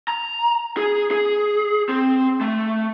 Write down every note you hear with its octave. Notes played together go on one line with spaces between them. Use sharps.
A#5
G#4
G#4
C4
A3